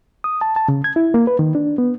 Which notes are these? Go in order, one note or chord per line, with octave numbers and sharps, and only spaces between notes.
D#6
A5
A5
C#3
G#6
E4
A#3
B4
D#3
D4
B3